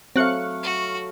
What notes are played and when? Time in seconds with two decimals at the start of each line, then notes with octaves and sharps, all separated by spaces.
0.16 F#3 A3 C4 F5 F#6 C#7
0.63 F#4